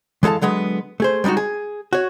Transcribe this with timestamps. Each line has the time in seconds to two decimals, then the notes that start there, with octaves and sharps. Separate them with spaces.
0.23 E3 G#3 A4 F5 A5
0.41 D3 F#3 G#3 B3
1.00 A3 G#4 C5
1.24 G3 G#3 D4 D#4 F#4
1.37 G#4
1.93 F#4 C#5